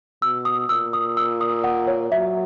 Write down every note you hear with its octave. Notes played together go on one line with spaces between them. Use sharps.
B2 E6
D#6
A#2 E6
D#6
E6
D#6
F#5
C#5
F#3 E5